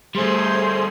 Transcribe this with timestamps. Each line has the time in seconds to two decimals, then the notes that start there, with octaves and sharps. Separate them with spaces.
0.15 G3 A3 G#4 C5 C6